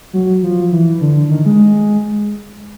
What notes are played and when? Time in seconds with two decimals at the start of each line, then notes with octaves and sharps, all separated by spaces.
0.13 F#3
0.43 F3
0.72 E3
1.01 D3
1.30 D#3
1.46 G#3